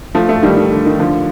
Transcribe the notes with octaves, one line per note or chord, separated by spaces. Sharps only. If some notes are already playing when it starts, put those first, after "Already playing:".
F3 A3
F3 A3
D#3 G3
D#3
D3
D#3
D3 F3